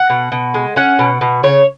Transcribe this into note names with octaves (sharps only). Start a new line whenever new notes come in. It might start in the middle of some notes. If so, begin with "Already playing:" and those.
Already playing: F#5
B2
B2
G#3
C#4 F#5
B2
B2
C#3 C#5